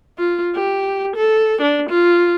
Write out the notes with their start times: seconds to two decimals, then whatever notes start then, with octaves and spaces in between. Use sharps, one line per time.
0.18 F4
0.56 G4
1.16 A4
1.62 D4
1.90 F4